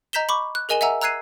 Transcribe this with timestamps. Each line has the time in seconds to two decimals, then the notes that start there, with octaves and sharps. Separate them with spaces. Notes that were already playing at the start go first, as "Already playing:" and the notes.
0.13 D#5 A#5 G6 B6 E7 G7
0.29 B5 C#6 D6
0.55 F#6
0.69 G#4 A#4 D#5 G#5 E7 G7
0.81 D#5 E5 F#5 G#5 A#5 E6
1.02 A#5 E6 F#6 G#6 C7 D#7